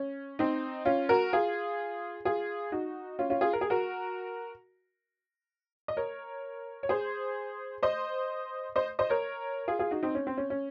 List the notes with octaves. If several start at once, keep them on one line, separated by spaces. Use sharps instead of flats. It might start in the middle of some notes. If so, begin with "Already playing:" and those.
Already playing: C#4
C4 D#4
C#4 F4
F#4 A#4
F4 G#4
F4 G#4
D#4 F#4
C#4 F4
C#4 F4
F4 G#4
A#4
G#4
F#4 A#4
D#5
A#4 C#5
C#5
G#4 C5
C5 D#5
C5 D#5
C5 D#5
A#4 C#5
F4 G#4
F4 G#4
D#4 F#4
C4 D#4
C#4
C4
C#4
C#4